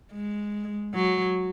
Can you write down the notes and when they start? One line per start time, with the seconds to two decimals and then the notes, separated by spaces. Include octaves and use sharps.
0.13 G#3
0.94 F#3